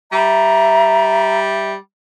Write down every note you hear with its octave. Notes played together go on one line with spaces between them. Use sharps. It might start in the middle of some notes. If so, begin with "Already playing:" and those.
G3 E5 A#5